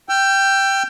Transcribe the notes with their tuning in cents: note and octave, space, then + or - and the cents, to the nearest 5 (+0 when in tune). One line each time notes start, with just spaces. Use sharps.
G5 +0 E6 +40